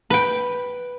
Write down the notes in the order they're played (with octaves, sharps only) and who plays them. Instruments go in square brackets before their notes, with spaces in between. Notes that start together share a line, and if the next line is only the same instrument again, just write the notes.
[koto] B4 G5